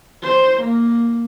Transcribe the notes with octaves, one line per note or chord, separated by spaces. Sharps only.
C5
A#3